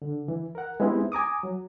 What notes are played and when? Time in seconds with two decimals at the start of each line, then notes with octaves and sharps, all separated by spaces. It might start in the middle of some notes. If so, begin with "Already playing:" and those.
0.02 D3
0.28 E3
0.55 A#4 F#5
0.80 G#3 B3 C4 D#4 E4 G4
1.12 G#5 A#5 D6 D#6
1.43 F#3